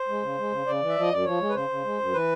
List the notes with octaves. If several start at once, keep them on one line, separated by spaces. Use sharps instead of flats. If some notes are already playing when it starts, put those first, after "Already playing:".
Already playing: C5
G#3
C#3
G#3
C#3
C#3 D5
E3
E5
F3 D#5
F#2 D5
F3 C#5
G#3
B4
C#3 C5
C#3
G#3
F#2
E3 B4